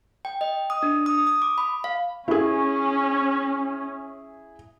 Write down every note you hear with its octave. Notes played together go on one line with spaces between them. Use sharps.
G5
D#5
D#6
D4
D#6
D#6
D6
B5
F5
C#4 E4 G#4